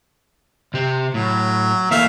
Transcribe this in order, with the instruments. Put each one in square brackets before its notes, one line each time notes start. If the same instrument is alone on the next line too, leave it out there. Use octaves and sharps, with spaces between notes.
[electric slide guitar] C3 G4
[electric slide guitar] A2 [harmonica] F#3
[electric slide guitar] E3 A3 A#3 [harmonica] E5 F5